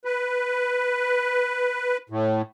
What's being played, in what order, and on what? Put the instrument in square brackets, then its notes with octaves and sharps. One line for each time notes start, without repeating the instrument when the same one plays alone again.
[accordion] B4
A2